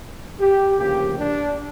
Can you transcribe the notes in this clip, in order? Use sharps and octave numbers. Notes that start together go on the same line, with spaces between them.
G4
D2 C#3 F3 A#3 G4
D4